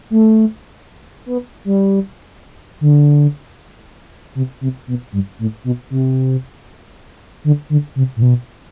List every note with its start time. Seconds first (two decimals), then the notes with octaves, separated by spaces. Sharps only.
0.10 A3
1.26 B3
1.65 G3
2.81 D3
4.35 C3
4.61 C3
4.87 B2
5.12 G2
5.39 A2
5.64 B2
5.90 C3
7.44 D3
7.70 D3
7.96 C3
8.16 A2
8.22 B2